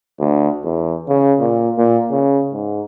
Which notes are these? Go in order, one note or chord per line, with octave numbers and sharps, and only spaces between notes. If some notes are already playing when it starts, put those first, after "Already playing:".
D2
E2
C#3
A#2
A#2
C#3
G#2